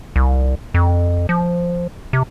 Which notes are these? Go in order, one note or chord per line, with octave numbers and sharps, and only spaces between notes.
C2
F2
F3
C3